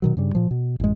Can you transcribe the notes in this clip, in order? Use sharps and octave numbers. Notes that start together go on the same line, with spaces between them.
B2 D#3 F#3
G2 C#3 G3
A#2 F3
B2
A1 F#2 G#3